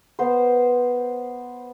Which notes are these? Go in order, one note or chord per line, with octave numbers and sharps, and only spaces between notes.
B3 C5